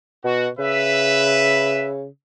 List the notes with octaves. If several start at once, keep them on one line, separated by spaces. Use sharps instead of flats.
B2 F#4
C#3 B4 E5